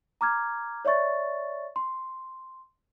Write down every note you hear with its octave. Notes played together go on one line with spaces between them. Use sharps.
A#5 D6 F6 G#6
C#5 D5 E5 C#6 A6
C6